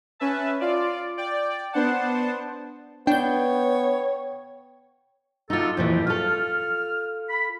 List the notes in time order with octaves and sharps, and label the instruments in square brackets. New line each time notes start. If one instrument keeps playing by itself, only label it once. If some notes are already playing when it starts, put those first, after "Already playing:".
[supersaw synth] C#4 B4 E5 A5
F4 D5
D5 G5
B3 D4 C5 F#5 A5
[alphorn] B3 [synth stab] D4 G6 [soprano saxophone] C#5 [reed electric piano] G5
[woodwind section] C3 B3 A4 [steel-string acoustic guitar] D#4 F4
[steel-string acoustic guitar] F2 A#2 E3 [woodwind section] A3 D4 G4
[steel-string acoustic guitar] F4 A4 [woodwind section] F6
[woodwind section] B5